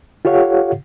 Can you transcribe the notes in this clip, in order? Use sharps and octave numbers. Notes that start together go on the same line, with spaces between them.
F4 G4 A4 C#5 F5 F#5